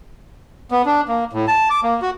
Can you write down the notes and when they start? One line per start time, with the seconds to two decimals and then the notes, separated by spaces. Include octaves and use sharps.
0.71 B3
0.86 D4
1.08 A#3
1.33 A2
1.47 A5
1.70 D6
1.83 A#3
2.02 F#4